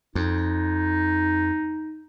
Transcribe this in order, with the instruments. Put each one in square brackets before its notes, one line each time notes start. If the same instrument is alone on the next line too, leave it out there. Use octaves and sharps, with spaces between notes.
[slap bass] F2 [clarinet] D#4